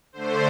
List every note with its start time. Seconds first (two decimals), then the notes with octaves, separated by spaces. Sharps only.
0.13 D3 A3 C5